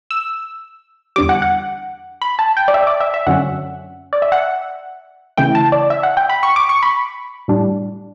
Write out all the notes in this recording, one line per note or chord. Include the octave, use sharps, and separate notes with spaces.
E6
E2 D3 G3 D6
F#5
F#5
B5
A5
G5
D5
E5
D5
E5
E5
F#2 D3 F#3 C#4 F#5
D5
E5
F#5
C#3 E3 A3 E4 G5
A5
D5
E5
F#5
G5
B5
C#6
D6
C#6
B5
A2 G3 D4